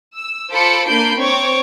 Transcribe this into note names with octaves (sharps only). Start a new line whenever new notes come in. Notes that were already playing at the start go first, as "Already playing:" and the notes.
E6
F4 A4 C5 B5 D6 C#7
A#3 D4 B5 G6 C7 D7
C4 C#5 D6